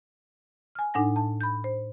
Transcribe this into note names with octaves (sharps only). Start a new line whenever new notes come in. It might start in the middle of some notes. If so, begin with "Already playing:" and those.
G#5 F6
A2 D4 D#4 F#5 G#5 A#6
A5
B5 G6
C5